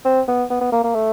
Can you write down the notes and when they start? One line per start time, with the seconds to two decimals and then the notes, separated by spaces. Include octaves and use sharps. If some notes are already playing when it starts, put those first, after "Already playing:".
0.05 C4
0.28 B3
0.50 B3
0.61 B3
0.72 A#3
0.84 A#3
0.95 A3